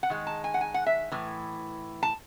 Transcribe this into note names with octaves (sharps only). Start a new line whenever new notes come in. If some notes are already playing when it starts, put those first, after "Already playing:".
F#5
D#3 G#3
A5
G#5
F#5
G#5
F#5
E5
A2 E3
A5